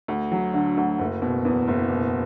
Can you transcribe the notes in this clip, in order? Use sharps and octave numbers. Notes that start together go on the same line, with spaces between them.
D2
F#3
D3
D2
F#1
B2
E2
F#1
B2